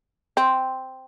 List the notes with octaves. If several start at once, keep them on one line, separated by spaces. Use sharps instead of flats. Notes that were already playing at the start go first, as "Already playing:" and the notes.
C4